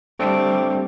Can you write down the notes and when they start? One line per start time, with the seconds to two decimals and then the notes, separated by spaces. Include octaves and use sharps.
0.19 G3 A3 C4 D4